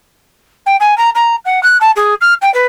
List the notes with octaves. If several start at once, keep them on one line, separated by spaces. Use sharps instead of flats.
G5
G#5
A#5
A#5
F#5
F#6
A5
G#4
F6
G5
B4